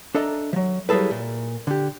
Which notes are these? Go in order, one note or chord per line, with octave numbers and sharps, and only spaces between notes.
D4 A4 D#5 E5 A#5
F3 F#3
F#3 G3 E4 G#4 A4 B4
A#2
D3 G4